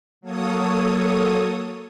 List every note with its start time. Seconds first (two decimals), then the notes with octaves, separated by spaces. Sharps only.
0.21 F#3 A#3 A4 C#5 D#6